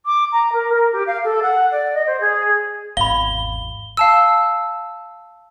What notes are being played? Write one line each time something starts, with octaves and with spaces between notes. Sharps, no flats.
D6
A#5
A#4
A#4
G4
F5
A4
F#5
D5
D#5
C5
G#4
G#1 E2 F5 B5 G7
F5 A5 E6